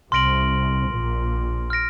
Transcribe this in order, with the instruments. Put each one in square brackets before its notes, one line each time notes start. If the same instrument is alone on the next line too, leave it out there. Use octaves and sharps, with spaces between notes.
[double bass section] C2 C3 [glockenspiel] C6 F6 A#6 D7 F#7
[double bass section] A#1 A#2
[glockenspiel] F6 A#6 D7